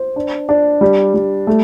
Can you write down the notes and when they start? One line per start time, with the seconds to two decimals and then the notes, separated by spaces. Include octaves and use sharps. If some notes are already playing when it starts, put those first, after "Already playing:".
Already playing: C5
0.16 D4
0.49 D4
0.81 G3
1.14 G3
1.47 A3